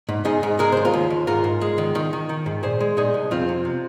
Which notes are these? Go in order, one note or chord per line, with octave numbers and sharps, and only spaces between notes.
G#2
G#2 D#4 G#4
G#2
G#3 A#4
D#2 C5
F4 A#4
D#2
D#2
G#2 F4 A#4
G#2
G#3
D#3
D#3
D#3
D#3
G#2
A#2 G#4 C5
G#3
A#2 D#4 G#4
C2
F2 C4 F4
C3
C3